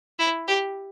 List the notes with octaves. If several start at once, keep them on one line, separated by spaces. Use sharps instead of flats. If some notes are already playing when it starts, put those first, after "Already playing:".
E4
G4